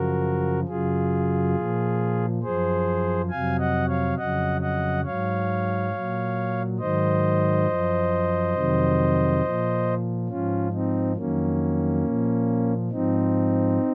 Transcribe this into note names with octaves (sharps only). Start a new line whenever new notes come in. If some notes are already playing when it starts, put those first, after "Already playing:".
Already playing: F#2 C#3 F3 F#4 A#4
F#2 C#3 F#3 F4 G#4
A#2 F3
F#2 F3 G#4 C5
F2 C3 F#3 F5 G#5
D#5 F#5
C#5 F5
F2 C#3 F#3 D#5 F#5
D#5 F#5
G#2 F#3 C#5 F5
A#2 F#3
G#2 D#3 F#3 C5 D#5
F#2 F3
F2 C3 D#3 F#3
A#2 F3
G#2 F3 C#4 F4
C4 D#4
F2 D#3 F#3 A#3 C#4
A#2 F3
G#2 F3 C4 D#4